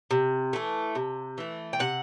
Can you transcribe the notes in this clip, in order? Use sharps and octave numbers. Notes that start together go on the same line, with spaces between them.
C3
E3 A3
C3
E3 A3
G5
C3 F#5